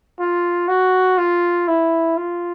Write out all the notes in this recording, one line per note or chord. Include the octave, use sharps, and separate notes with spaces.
F4
F#4
F4
E4
F4